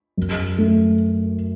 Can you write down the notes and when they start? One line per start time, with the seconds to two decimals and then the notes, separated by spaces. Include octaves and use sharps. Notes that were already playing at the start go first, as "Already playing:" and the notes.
0.17 F#2
0.58 A3